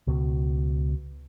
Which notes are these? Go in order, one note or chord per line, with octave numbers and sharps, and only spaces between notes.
C#2 B2